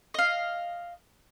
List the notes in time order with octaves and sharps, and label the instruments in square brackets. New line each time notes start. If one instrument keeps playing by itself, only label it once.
[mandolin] D#5 F5